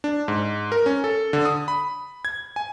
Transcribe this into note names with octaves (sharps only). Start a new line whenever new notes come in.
D4
G#2
A#4
C#4
A4
D3
D#6
B5
G#6
G#5